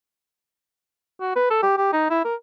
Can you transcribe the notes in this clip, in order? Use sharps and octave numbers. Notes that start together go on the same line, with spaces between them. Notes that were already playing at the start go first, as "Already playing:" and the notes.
F#4
B4
A4
G4
G4
D#4
E4
A#4